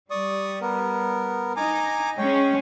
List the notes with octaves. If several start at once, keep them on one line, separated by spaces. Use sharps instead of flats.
G3 D5 C#6 D#6
B3 A#4
D#4 G#5 A#5 D6
G#3 C#4 C#5 G5